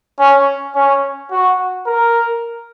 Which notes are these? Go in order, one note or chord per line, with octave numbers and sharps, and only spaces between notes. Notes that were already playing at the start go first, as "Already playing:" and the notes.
C#4
C#4
F#4
A#4